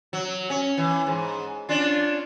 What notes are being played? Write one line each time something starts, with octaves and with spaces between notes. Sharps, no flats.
F#3
C#4
E3
G#2
C#4 D4 F4